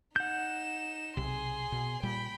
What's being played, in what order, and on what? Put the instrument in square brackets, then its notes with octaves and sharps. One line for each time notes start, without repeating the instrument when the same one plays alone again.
[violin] D#4 E7 [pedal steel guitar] F#5 G6
[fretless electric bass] B1 C3 [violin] G#4 C6
[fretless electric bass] B2
[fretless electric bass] A#2 G3 [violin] G5 B5